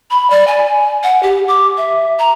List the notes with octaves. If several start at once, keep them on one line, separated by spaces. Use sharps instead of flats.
B5
D5
G#5
F#5
G4
D6
E5
A#5